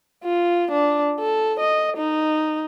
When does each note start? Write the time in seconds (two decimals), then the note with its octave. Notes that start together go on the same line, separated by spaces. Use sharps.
0.24 F4
0.72 D4
1.19 A4
1.60 D#5
1.97 D#4